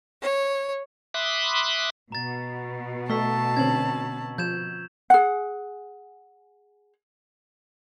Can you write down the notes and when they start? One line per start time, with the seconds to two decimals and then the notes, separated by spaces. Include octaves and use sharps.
0.22 C#5
1.14 E5 B5 C6 D6 D#6 F#6
2.12 B2 A#5 A6
3.10 A3 A5 C#6 E6 B6
3.57 D3 C4 C#4 G#6 F#7
4.38 F3 G6 G#6 E7
5.10 G#4 F#5